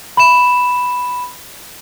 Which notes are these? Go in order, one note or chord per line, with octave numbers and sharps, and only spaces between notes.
B5 E7